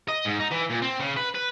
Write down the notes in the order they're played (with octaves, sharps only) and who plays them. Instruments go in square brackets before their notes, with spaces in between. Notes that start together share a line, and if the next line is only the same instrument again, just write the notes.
[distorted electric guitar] D#5
G#2
D#4
E3
A#2
C4
C#3
B4
B4